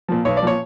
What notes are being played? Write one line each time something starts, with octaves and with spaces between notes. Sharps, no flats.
A#2 F3
B1 C#5
D5
A#2 F3 C#5